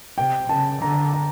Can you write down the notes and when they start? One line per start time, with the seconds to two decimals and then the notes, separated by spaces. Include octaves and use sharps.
0.18 C3 G5
0.49 C#3 A5
0.82 D3 A#5
1.13 A#5